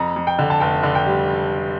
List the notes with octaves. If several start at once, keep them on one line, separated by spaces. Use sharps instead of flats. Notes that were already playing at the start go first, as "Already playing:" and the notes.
Already playing: F2 A#5
F2
G5
D3
A5
F1 G5
D3
G5
G3